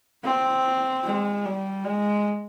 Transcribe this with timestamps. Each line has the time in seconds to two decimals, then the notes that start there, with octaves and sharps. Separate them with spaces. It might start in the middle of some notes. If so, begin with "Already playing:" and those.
0.24 C4
1.04 G#3
1.45 G3
1.85 G#3